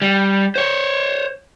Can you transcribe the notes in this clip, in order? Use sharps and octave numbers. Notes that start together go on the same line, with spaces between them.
G3
C5 C#5